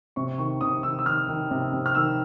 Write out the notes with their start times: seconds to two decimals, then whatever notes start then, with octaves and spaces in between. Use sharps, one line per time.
0.16 C3 C#6
0.38 D#3 C#6
0.61 C3 D#6
0.83 D#3 E6
0.99 E6
1.06 D#3 F6
1.29 D#3
1.51 C3
1.74 C3
1.86 F6
1.95 D#3 E6